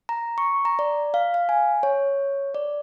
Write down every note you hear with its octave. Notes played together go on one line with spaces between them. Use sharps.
A#5
C#6
A#5
D5
F5
F5
G#5
C#5
D5